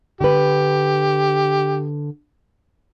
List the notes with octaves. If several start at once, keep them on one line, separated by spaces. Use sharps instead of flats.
D3 G4 B4